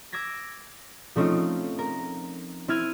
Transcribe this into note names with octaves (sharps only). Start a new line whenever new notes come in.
D6 E6 G#6 A#6 B6
F3 A3 C4 C#4 D#4 F4
A#4
C4 E4 F6 G#6 D#7